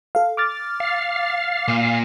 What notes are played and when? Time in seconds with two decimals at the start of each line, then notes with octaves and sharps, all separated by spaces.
0.15 A4 F5
0.37 D6 F6 A6
0.80 F5
1.68 A#2